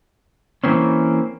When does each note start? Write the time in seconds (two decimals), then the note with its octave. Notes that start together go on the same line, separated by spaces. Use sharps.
0.64 E3 A#3 C4 C#4